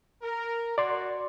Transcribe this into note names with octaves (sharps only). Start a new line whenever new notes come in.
A#4
F#4 D5 C6